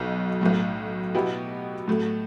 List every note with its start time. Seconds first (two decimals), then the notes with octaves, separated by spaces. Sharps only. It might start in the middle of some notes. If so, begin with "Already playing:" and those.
Already playing: B1 B2 B3
0.41 B1 A2 F#3
1.15 B2 F#3 B3 E4 G4
1.88 A2 F#3 A3